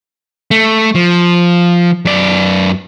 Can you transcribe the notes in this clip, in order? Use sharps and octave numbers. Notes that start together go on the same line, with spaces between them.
A3
F3
F#2 D5